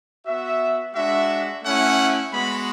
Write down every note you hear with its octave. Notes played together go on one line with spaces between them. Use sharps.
B3 F#4 E5
G#3 D4 F#4 E5
A3 C#4 E4 F#5
G#3 B3 F#4 B5